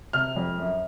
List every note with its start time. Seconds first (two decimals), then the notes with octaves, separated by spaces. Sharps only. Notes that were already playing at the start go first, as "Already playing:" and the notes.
0.13 C3 F6
0.36 F2
0.58 F#2